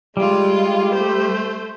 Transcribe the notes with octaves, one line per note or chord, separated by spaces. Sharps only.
G3 G#3 F4
A3 C5